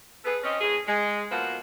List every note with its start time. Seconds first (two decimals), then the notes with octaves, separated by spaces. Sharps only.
0.24 G#4 A4 B4
0.43 C4 C#4 D#5
0.61 A2 G#4
0.87 G#3
1.31 B2 F3 A#3 B4 C5 F#5